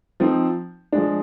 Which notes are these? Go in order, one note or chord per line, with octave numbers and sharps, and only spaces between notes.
F3 C4 D#4
F3 G#3 D4